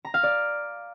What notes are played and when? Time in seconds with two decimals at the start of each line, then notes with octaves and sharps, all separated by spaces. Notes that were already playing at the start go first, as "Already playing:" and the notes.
0.05 A#5
0.14 F5
0.23 D5